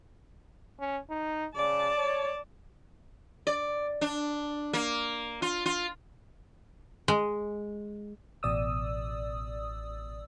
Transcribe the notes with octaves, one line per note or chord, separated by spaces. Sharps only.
C#4
D#4
C#3 D5 A5
C#5
D5
D4
A#3
F4
F4
G#3
A1 B2 D5 D#6 E6